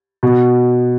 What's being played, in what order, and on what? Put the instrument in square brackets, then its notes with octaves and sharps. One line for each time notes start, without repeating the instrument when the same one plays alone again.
[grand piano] B2